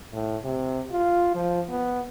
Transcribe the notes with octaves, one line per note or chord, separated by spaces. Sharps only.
A2
C3
F4
F3
B3